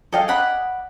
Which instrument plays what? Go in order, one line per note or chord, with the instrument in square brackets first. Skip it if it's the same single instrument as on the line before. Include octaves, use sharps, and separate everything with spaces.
[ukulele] G#4 D#5 F5 [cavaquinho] A4 G5
[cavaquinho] D5 F#5 B5